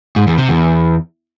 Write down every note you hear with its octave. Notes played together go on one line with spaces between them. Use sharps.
G#2
E2
C3
E2